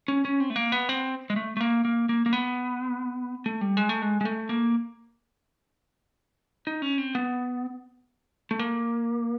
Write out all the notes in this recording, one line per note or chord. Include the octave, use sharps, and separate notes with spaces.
C#4
C#4
C4
A3
A#3
B3
C4
G#3
A3
A3
A#3
A#3
A#3
A#3
B3
A3
G3
G#3
A3
G#3
G#3
A3
A#3
D#4
C#4
C4
B3
A3
A#3